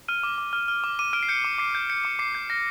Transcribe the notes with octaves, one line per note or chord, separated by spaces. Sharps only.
F6 D#7
D6
D6
F6
F6
D6
D6 D#7
F6 D7
C7
G6 C#7
D6
D6 C7
G6
G6 C#7
D6 C#7
D6 C7
G6
F6 A#6